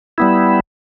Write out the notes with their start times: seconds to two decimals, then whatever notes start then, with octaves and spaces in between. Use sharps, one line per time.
0.18 G3 B3 E4